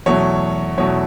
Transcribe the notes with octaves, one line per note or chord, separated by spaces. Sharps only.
E2 B2 F#3 A3 C#5
E2 B2 F#3 A3 C#5